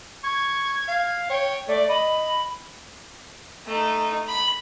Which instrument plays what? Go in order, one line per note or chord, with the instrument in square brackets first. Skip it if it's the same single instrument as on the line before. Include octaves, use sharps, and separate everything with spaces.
[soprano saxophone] C#6 [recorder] G#6
[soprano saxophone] F5
[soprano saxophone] C#5 [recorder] G5
[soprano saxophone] A3 [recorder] D5
[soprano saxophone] D#5 [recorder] B5
[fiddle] A3 D#4
B5